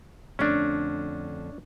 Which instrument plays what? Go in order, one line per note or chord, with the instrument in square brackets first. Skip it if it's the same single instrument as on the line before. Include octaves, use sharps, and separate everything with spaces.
[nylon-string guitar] F2 D3 A3 [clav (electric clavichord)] C#4 D4